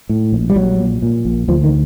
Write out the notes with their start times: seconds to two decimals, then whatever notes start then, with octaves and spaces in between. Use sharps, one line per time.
0.09 A2
0.32 A#1
0.50 G3
0.56 A#1 F#3
0.79 A#2
1.02 A#2
1.25 A#1
1.48 D2 F3
1.64 D#3